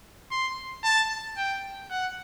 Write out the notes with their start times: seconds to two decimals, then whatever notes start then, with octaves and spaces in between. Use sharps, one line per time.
0.31 C6
0.84 A5
1.37 G5
1.91 F#5